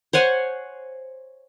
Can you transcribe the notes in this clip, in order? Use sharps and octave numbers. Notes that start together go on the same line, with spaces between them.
C5 C#5 F#5 G#5